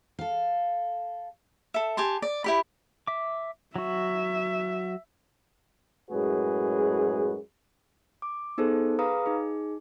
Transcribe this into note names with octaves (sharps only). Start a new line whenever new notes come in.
A4 F5
A4 E5
G4 G#5 A5 C6
D5
E4 G4 B5
E5 D6
F#3 F#4 E5
F#2 A2 G#3 F#4 G#4 B4
D6
B3 D#4 G#4 A4 C5
G#4 B4 F5 A#5 D#6
D#4 G#4